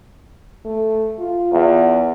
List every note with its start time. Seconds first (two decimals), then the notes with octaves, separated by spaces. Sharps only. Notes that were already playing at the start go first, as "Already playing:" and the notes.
0.65 A3
1.19 F4
1.53 E2